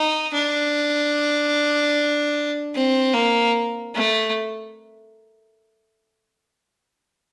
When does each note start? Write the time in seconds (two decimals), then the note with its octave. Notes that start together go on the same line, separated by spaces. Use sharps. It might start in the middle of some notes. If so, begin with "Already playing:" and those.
Already playing: D#4
0.33 D4
2.74 C4
3.14 A#3
3.95 A3